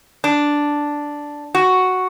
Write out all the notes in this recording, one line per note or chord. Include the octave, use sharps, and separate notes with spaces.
D4
F#4